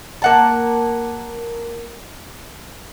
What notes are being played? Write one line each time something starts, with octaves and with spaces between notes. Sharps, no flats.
A#3 F#5 A5